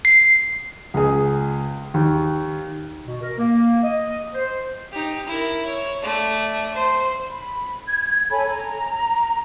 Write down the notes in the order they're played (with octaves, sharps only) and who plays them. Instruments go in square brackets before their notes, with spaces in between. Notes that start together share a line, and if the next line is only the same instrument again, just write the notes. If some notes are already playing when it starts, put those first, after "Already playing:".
[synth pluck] C7
[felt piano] C#2 G#4
D#2
[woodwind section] B2
A#4
A#3
D#5
C5
[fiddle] D#4 G4
E4 A#4
C#5
A3 D5
C5
[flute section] B5
G#6
A4 C#5 G#5 B5
A#5